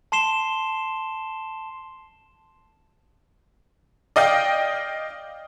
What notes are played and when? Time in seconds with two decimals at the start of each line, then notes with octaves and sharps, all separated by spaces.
0.12 A5 C6 C7 E7 G7
4.16 D5 D#5 F5 G5